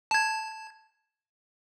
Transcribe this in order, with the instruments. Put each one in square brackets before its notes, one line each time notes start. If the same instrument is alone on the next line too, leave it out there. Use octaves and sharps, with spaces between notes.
[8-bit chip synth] A5 G#6